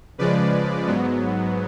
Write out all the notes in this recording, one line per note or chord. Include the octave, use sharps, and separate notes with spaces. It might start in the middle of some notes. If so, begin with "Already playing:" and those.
C#3 F3 G#3 B4 D5
G#2 F#3 B3